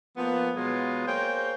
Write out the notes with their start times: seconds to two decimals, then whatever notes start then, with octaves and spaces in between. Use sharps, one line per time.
0.17 F3 A#3 B3
0.56 B2 F#3 G#3 B3 F4
1.07 A#3 G#4 C5 C#5 G5